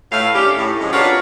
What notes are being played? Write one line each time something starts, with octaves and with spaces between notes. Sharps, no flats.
A2 A3 E4 B4 F5
D#3 C#4 D4 G4
A2
F#2 C3 F3 F#3 G#3
D4 F4 F#4 A#4 B4 C#5